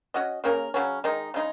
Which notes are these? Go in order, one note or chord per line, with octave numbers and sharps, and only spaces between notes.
C#4 F#4 D#5
C#3 A#3 C#4 A#4
C#3 F#3 C#4
D#3 G#3 D#4
C#3 G#3 D#4